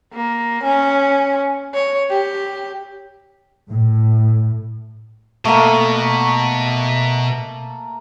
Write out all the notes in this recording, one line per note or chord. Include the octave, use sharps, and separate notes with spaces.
A#3
C#4
C#5
G4
A2
B2 A3 A#3